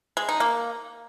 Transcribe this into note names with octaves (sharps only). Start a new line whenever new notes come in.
G#3
D#4
A#3